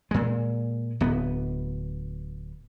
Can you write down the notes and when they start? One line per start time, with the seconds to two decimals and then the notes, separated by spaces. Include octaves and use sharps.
0.11 A#2 G#3
1.01 D1 B3